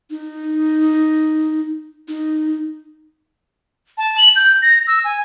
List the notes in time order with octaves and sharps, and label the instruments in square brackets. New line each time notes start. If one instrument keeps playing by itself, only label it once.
[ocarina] D#4
D#4
[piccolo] A5
F#7
G6
A#6
E6
G#5